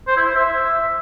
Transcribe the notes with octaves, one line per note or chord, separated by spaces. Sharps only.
C5
E4
C5
E5